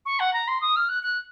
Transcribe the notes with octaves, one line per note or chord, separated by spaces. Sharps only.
C#6
F#5
A#5
C6
D#6
F6
F#6
F#6